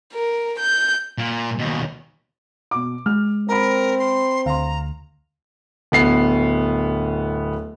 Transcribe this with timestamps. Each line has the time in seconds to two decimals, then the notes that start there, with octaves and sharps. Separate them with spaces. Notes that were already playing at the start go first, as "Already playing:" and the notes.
0.13 A#4
0.59 G6
1.18 A#2
1.59 D#2 B2
2.71 B2 D6
3.06 G#3 F6
3.49 C4 A#4 A#5 B5
3.99 C6
4.46 D2 F5 A#5 C6
5.92 D1 B3 C7